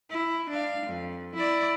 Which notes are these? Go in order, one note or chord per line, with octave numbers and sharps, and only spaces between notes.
E4
D4 F5
F2
E4 D5